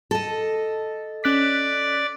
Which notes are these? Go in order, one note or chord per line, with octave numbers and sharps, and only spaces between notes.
A4 D#5
C#4 D5 F#6 B6